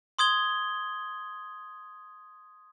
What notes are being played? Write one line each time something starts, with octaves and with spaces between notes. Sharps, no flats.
C6 D#6 G#6 G7